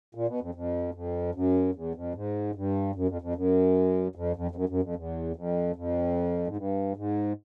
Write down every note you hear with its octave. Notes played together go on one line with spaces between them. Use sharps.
A#2
B2
F2
F2
F2
F#2
E2
F2
G#2
G2
F#2
F2
F2
F#2
F2
F2
F2
F#2
F#2
F2
E2
F2
F2
G#2
G2
G#2